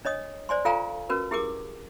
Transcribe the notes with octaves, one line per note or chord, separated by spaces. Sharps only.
D4 C#5 D#5 D#6
C5 D5 G#5 C6
F4 A4 F5 G5 G#5 A#5
C#4 F#4 A#4 B4
E4 G4 G#4 A#4 D6